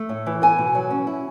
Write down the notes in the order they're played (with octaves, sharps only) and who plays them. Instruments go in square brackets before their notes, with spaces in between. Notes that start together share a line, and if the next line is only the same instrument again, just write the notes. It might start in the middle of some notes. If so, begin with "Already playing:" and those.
Already playing: [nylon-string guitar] A3
A2
E3
B3 G#5
B2
F#3
C#4
E4